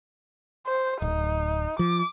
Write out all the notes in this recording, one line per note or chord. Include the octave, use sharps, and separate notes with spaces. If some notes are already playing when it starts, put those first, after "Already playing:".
C5
D1 D#4
F3 D6